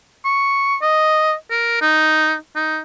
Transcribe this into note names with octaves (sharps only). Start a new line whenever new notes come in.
C#6
D#5
A#4
D#4
D#4